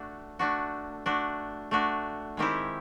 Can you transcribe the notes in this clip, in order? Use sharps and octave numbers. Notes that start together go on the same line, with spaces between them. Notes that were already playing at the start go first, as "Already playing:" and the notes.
Already playing: A3 D4 F#4
A3 D4 F#4
A3 D4 F#4
A3 D4 F#4
D#3 G#3 C4 E4 G4